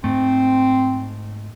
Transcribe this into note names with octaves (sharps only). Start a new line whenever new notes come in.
G#2 A3 C4